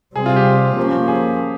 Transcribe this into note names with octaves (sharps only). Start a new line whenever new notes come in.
C3 G3 C4 G#4
F4
G4
F3 A#3 C#4
G#4